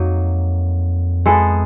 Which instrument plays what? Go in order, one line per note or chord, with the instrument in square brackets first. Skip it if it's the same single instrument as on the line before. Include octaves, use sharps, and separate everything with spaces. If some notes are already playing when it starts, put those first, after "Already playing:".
Already playing: [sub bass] F2 [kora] F#3 A#3 D#4
[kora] G#3 B3 E4 A4